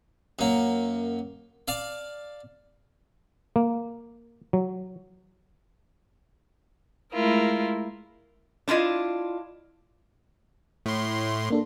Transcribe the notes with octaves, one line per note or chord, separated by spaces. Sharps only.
F#2 A#3
D5 F5 A5
A#3
F#3
G#3 A3 E4 F4 A#4
D4 E4 F4 D#5
A2 C6
A#3 D4 A4